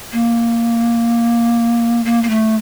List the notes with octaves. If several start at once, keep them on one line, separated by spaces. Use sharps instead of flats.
A#3
A#3
A#3
A3